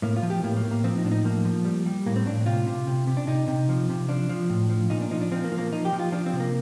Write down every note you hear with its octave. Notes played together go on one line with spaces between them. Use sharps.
A2 A#3
F4
F3
G4
A2 A#3
A#3
A2
A#3
F3 C4
D#4
A2 D4
D#4
F3 A#3
F3
G3
G3
A2 A#3
C4
A2 D4
C3 F4
C3
C3
C3
D4
C3 D#4
C3
F3
C3
F3 D4
F3
A2
F3
A#2 D#4
D4
F3 D#4
D4
F3 C4
A#3
F3
A#3
F3 D#4
G4
F3
F4
F3 D4
C4
C3
A#3